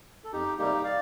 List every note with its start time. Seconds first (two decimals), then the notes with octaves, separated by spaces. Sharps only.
0.24 A4
0.32 F2 D#4 G4
0.58 C3 G3 A#3 D#4 G4
0.84 D5 F5